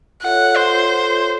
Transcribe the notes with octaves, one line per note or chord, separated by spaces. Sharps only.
F4 A4 C#5 E5 F#5
C5